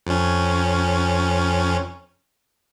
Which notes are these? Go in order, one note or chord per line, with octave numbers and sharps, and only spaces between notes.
F2 C#4